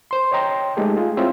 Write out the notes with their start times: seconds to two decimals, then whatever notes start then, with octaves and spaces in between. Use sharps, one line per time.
0.11 C5 C6
0.32 C#5 D#5 G5 A#5 C6
0.77 G#3 A3 D#4 G4 A4
0.97 F4 G#4
1.17 C4 E4 F4 C#5 E5